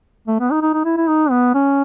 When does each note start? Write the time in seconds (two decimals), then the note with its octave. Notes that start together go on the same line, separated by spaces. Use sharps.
0.27 A3
0.40 B3
0.51 D#4
0.62 D#4
0.74 D#4
0.85 E4
0.97 E4
1.08 D#4
1.30 B3
1.54 C#4